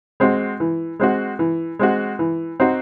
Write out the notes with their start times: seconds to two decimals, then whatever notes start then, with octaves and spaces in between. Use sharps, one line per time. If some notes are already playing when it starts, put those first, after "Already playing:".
0.20 G#3 C4 F#4
0.60 E3
1.00 G#3 C4 F#4
1.39 E3
1.79 G#3 C4 F#4
2.19 E3
2.60 C4 D#4 F#4